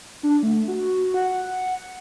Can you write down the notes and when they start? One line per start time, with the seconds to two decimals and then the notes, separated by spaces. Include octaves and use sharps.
0.23 D4
0.43 A3
0.68 F#4
1.14 F#5